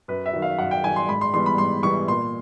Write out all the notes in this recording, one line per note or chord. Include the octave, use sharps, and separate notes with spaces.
F#2 B4
E5
D#3 F#3
F5
F#2 F#5
G5
D#3 F#3 G#5
C6
G#2 B5
C6
E3 G3 B3 C6
B5
G#2 C6
E3 G3 B3 C#6
A#2 C6